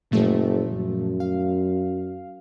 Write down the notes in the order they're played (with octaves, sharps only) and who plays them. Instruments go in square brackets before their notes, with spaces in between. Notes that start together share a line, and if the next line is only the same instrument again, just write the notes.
[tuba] F#1 [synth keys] A#2 F3 A3
[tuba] F#2
[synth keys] F5